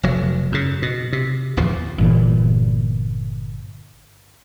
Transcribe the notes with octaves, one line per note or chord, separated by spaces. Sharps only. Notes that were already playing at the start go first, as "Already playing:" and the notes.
F1 F#3
F#2 C#3
B2
C3
D1 E2 F3
G1 A#2 E3